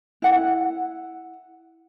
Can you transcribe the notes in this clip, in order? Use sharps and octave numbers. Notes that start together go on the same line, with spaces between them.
E4 F#5